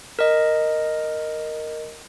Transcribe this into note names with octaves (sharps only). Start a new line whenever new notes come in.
A#4 D#5